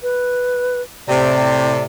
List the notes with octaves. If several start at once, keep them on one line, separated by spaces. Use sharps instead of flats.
B4
A2 C3 D5